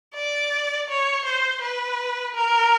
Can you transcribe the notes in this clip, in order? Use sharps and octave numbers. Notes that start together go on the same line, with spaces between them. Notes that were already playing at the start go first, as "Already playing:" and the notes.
D5
C#5
C5
B4
A#4